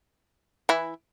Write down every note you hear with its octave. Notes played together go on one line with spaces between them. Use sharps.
E3 E4